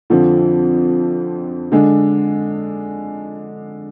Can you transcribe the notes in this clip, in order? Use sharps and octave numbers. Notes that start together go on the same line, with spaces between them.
F2 D3 F3 C4
D3 G#3 D4